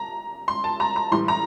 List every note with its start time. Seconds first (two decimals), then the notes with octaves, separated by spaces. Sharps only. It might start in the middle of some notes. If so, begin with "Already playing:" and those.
Already playing: A5 A#5
0.48 C6
0.64 A5
0.80 A#5
0.96 A#5
1.11 A2 E3 G3 C6
1.28 A#5